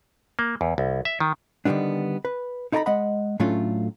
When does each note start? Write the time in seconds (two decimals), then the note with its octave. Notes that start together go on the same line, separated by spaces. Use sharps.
0.39 A#3
0.61 E2
0.78 C2
1.05 E5
1.20 D#3
1.65 D3 D#3 F3 G3 B3 D4
2.25 B4
2.72 D#4 E4 A4 D5 A#5 B5
2.86 G#3 D#5 F#5 B5
3.40 A2 F#3 A3 C#4 D4 F4